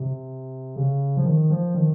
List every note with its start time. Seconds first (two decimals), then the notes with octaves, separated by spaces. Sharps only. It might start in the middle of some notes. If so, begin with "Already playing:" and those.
Already playing: C3
0.76 C#3
1.17 F3
1.25 D#3
1.50 F3
1.74 D#3